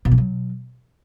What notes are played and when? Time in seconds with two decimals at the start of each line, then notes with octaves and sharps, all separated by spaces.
0.05 B2
0.11 E3
0.18 F#3